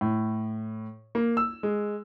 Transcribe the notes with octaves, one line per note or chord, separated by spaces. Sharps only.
A2
A#3
E6
G#3